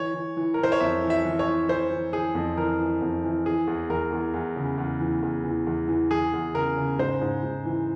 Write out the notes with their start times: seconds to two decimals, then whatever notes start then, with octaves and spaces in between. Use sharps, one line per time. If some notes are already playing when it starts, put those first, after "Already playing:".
Already playing: E3 C#5
0.14 E3
0.37 E3
0.54 A#4
0.59 E3 C5
0.72 C#5
0.80 F2 E5
1.03 E3
1.10 E5
1.25 E3
1.39 C#5
1.47 E3
1.69 E3 C5
1.90 E3
2.13 E3 G#4
2.35 F2
2.57 E3 A#4
2.79 E3
3.02 F2
3.24 E3
3.46 E3 G#4
3.67 E2
3.89 E2 A#4
4.12 E2
4.34 E2
4.56 C#3
4.78 E2
5.00 E3
5.22 E2
5.44 E3
5.66 E2
5.88 E3
6.11 E3 G#4
6.33 E2
6.54 C#3 A#4
6.77 C#3
6.98 G#2 C5
7.21 G#2
7.43 G#2
7.65 E3